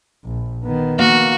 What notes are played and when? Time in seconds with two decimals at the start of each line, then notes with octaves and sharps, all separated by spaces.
0.24 A#1
0.64 D#3 B3
0.99 A#3 F#4